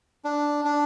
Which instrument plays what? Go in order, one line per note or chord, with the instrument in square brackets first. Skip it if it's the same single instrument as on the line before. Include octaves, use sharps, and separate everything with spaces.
[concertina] D4
D4